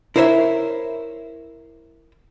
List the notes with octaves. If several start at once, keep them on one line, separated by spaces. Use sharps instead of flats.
E4 A#4 C5 C#5 E5